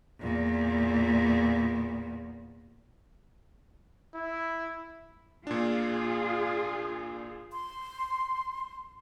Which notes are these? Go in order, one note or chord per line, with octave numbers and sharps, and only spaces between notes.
E2 A#2
E4
A#2 D4 F4 G#4
C6